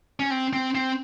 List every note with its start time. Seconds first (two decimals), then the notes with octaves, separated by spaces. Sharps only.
0.20 C#4
0.30 C4
0.53 C4
0.75 C4